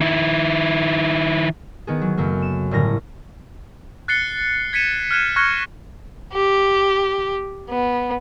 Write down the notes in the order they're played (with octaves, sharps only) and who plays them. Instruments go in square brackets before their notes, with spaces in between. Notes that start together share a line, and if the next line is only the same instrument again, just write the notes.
[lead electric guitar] D#3 E4
[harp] D#3 B3 G#4
F#3
F#2 C#3 A3 A#3
E7
G1 A2 D3 C#4 A#4 A#6
[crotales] F#6 A6 C7 C#7 G7
G#6 B6 C#7 D#7 E7
F6 F#6 G#6 D#7 E7
C#6 F6 F#6 G#6 A#6 C#7
[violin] G4
B3